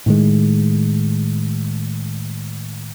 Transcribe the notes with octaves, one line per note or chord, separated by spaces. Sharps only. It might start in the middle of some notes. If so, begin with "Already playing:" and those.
A2 D#3 G#3